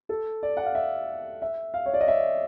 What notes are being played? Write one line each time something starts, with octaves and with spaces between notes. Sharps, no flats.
A4
D5
F#5
F5
E5
E5
F5
C#5
D5
D#5
E5